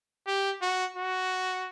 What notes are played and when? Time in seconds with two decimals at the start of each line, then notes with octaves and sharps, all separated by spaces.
0.27 G4
0.62 F#4
0.97 F#4